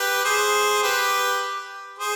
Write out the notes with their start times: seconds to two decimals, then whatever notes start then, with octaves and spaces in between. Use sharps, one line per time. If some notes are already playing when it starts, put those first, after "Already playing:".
Already playing: G4 B4
0.24 G#4 C5
0.82 G4 B4
1.99 G#4 C5